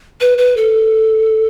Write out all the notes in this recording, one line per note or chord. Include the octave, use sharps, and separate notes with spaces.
B4
B4
A4